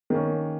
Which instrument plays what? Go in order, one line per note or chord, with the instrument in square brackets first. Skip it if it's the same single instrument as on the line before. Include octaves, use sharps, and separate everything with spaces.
[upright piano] D#3 A#3 C#4